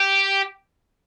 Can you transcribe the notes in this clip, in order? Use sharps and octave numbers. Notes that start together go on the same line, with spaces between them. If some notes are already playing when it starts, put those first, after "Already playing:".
Already playing: G4